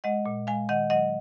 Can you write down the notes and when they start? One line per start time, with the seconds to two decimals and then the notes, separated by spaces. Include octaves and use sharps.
0.04 G#3 D#5 F#5
0.26 A#2
0.47 G#3 F5 G#5
0.69 D#3 D#5 F#5
0.90 F#3 D#5 F#5